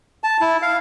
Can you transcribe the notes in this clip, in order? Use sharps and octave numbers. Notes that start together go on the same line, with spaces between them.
A5
E4
F5